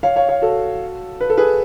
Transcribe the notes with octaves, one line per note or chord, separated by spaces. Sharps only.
C#5 F5
C#5 F5
C#5 F5
F#4 A4
B4
A4
G#4 B4